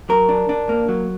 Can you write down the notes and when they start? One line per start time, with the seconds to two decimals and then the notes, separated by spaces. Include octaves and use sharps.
0.09 F#3 A#4
0.29 D4
0.49 D4
0.69 A#3
0.89 F#3